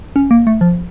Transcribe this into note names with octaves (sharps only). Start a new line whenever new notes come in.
C#4
A#3
A3
F3